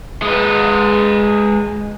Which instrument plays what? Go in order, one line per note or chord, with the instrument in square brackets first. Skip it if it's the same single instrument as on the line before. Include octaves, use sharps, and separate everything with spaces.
[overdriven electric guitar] G#3 B4